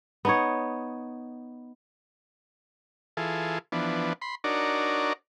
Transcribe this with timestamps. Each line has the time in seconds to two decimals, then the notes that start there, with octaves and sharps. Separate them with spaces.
0.25 B3 D#4 C#5
3.17 E3 F4 G#4 A4
3.72 E3 F3 B3 D4
4.22 B5 C6
4.44 D4 D#4 F#4 A#4 C#5 D5